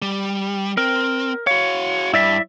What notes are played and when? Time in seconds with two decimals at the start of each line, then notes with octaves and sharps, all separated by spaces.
0.02 G3
0.77 C4 A#4
1.47 F#4 C#5 F5
2.14 G2 E4 D5 E5